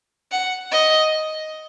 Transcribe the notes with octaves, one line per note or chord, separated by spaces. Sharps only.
F#5
D#5